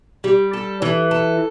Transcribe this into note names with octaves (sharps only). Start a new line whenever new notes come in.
G3
A4
E3
A4